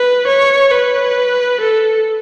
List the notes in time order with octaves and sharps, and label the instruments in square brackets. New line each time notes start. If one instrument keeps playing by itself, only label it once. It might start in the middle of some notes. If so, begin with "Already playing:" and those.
Already playing: [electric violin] B4
C#5
B4
A4